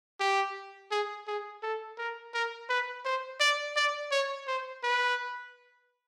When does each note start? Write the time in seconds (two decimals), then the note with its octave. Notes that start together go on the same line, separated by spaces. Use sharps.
0.20 G4
0.91 G#4
1.27 G#4
1.63 A4
1.98 A#4
2.34 A#4
2.69 B4
3.05 C5
3.40 D5
3.76 D5
4.11 C#5
4.47 C5
4.83 B4